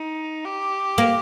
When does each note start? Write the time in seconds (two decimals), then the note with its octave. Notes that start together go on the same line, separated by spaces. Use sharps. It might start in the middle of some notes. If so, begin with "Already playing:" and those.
Already playing: D#4
0.45 G4
0.98 A#3